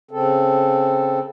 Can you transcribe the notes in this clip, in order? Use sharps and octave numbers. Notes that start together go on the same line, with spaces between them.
C#3 C4 A4